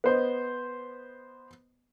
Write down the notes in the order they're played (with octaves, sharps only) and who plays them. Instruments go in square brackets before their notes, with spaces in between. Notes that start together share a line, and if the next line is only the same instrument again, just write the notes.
[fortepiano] B3 C5 D#5